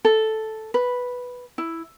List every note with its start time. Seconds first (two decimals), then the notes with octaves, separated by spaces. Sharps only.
0.05 A4
0.74 B4
1.58 E4